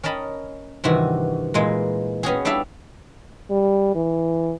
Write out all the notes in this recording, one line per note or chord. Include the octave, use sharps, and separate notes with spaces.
C#4 A#4 D#5 A5 B5
G2 C3 D#3 E3 F#4
A#2 E3 G#3 A#3
B3 C#4 F#4 G#4
G3 D4 E4 A4 E5 F5
G3
E3